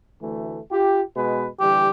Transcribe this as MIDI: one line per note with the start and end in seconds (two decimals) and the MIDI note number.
0.21 0.59 38
0.21 0.59 52
0.21 0.59 57
0.72 1.01 65
0.72 1.01 67
1.15 1.47 47
1.15 1.47 56
1.15 1.47 71
1.60 1.91 50
1.60 1.91 52
1.60 1.91 55
1.60 1.90 67